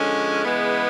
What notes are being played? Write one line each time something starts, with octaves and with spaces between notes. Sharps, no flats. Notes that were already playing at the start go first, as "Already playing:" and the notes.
Already playing: D3 F3 G#3 C#4
C#3 E3 G#3 B3